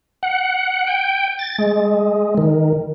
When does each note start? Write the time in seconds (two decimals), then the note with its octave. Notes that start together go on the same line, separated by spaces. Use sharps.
0.23 F#5
0.87 G5
1.39 A6
1.58 G#3
2.38 D#3